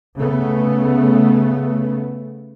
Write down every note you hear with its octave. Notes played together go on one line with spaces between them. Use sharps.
C#3 A3 B3